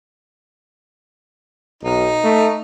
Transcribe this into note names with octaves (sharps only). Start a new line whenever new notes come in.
B1 D#4
A3